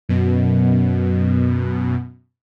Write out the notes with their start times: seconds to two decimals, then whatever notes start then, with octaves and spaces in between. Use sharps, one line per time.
0.09 F#2 B2